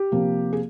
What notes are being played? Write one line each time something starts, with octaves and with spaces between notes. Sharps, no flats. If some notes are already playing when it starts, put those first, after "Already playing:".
Already playing: G4
C3 F3 A#3
G#4